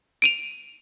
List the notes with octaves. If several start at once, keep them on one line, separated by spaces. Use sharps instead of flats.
D7 D#7 F7